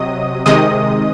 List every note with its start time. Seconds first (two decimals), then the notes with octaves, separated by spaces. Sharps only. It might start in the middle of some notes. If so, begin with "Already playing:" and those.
Already playing: C3 F#3 D#5 D#6
0.46 C3 D#3 G#3 D#5 D#6